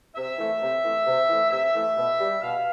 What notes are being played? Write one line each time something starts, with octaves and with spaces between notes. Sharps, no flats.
C3 E5
E3 A3
C3
E3 A3
C3
E3 A3
C3 E5
E3 A3
B2
G3
B2 F5